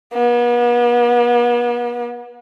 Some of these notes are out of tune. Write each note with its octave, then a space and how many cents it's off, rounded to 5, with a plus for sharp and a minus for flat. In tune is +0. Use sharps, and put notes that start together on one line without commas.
B3 -40